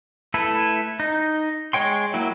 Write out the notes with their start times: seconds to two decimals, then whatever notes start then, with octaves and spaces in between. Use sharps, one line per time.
0.34 A3 E4 A4 B4
1.00 D#4
1.73 G#3 C#5 G5 C6
2.14 F#3 A#3 E4